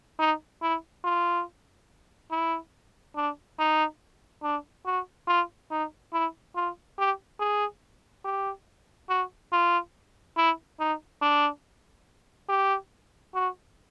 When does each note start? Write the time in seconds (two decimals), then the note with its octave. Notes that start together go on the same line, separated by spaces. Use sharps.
0.19 D#4
0.62 E4
1.04 F4
2.31 E4
3.16 D4
3.59 D#4
4.43 D4
4.86 F#4
5.28 F4
5.71 D#4
6.13 E4
6.56 F4
6.98 G4
7.39 G#4
8.25 G4
9.09 F#4
9.52 F4
10.37 E4
10.79 D#4
11.22 D4
12.49 G4
13.34 F#4